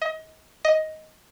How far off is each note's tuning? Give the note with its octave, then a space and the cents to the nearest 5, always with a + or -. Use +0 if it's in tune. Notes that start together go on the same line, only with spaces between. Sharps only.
D#5 +30
D#5 +10